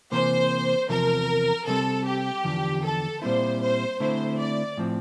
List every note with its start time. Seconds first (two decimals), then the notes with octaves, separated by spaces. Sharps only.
0.12 C3 E3 A#3 C5
0.89 E2 C3 F3 A#4
1.68 C3 G3 C4 A4
2.05 G4
2.44 E2 D3 F3
2.83 A4
3.22 A#2 G3 C4 E4 C5
3.61 C5
4.00 D3 A3 C4 E4 C5
4.38 D5
4.77 A2 F3 C4